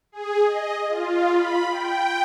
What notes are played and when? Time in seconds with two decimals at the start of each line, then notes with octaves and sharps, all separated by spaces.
0.12 G#4
0.46 D#5
0.89 F4
1.33 B5
1.70 G5